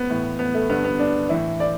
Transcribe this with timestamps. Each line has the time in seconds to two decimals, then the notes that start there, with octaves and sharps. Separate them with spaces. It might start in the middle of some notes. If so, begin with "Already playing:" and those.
Already playing: B3
0.10 A2 E3
0.39 B3
0.54 A3
0.69 G2 D3 B3
0.84 B3
0.99 D4
1.29 A2 E3 E4
1.60 D5